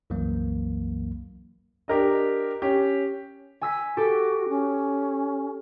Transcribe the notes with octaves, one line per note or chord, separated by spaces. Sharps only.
C2 F#2 E3 F#3 A#3
D4 G4 A#4 D#5
C#4 G4
G#5 E6 B6
F#4 G4 A4
C#4